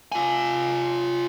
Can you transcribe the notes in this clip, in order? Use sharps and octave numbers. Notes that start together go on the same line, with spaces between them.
F4 G#5